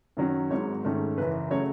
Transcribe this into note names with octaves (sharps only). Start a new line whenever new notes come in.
F#2 D#3 F#3 C#4
G#1 G#2 F#3 C#5
G#2 D#3 A3 C#4
F#1 F#2 E3 B4
C#3 F#3 A3 C#5